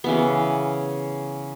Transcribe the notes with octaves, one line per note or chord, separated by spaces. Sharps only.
C#3 E3 B3